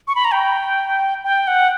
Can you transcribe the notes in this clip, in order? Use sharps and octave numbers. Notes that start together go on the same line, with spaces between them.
C#6
B5
A#5
G5
G5
F#5